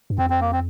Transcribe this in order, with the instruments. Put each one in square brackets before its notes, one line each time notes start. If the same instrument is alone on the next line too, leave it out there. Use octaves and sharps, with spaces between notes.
[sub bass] G2
[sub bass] F2 [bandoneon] C4
[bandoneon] C4
A#3
C4